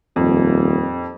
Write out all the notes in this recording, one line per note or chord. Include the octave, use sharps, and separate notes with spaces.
D#1 F2